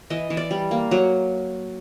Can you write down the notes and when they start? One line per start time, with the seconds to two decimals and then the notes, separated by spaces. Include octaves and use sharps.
0.10 E3 D#5
0.30 E3
0.37 D5
0.51 G3
0.71 A#3
0.91 F#3